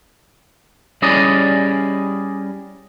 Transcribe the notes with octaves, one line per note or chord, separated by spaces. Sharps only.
G3 C#4 E4 G#4 D5 D#5